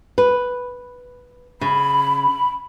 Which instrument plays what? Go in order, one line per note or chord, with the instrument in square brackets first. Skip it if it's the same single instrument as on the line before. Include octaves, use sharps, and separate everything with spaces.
[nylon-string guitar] B4
[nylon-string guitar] C#3 [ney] B5